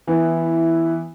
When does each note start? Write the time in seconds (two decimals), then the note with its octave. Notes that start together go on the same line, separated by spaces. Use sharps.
0.07 E3 B3 E4